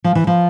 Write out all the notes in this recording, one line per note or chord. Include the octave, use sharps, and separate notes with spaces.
F3
E3
F3